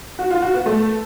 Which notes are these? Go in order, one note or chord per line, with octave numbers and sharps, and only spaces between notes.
F#4
F4
F#4
B3
A3